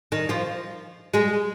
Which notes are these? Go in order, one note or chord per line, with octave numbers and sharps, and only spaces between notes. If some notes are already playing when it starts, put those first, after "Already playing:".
D#3 D#4
F3 F4
G#3 G#4